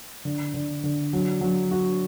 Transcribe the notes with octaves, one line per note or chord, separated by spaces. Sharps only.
D3
D3
D3
F#3
F#3
F#4